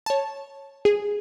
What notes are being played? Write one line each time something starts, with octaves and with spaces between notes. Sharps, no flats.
C#5 A5
G#4